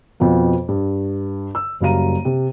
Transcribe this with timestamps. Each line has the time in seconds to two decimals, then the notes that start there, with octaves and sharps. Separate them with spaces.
0.20 F2 B2 F3 B3
0.68 G2
1.55 E6
1.81 F#1 F#2 G3 F5 A#5 D#7
2.25 C3